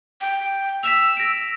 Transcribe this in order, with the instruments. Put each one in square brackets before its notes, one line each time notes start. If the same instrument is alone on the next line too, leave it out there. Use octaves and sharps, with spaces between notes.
[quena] G5
[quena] E6 [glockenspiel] B6 E7 F7
[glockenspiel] A#6 D7